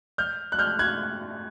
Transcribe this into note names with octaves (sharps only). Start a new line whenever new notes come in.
F6 G6
F#6
F6 G6
F#6 G#6